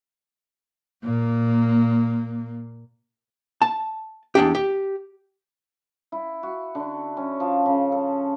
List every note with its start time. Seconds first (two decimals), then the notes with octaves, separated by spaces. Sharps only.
1.04 A#2 A#3
3.62 A5
4.35 E2 D4 G4
4.55 G4
6.12 E4
6.43 F#4
6.75 D3
7.17 C#4
7.40 F3
7.66 C#3
7.92 A4